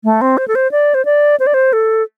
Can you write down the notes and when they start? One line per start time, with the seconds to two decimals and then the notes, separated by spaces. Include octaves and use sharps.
0.04 A3
0.21 C4
0.38 C5
0.48 A4
0.55 C5
0.72 D5
0.94 C5
1.05 D5
1.40 C5
1.47 D5
1.54 C5
1.73 A4